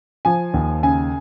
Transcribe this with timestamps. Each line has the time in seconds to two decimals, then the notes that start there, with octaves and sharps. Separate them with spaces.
0.25 F3 G#5
0.54 D#2
0.83 C#3 G#5